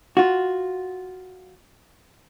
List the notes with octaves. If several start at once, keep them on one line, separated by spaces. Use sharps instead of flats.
F4 F#4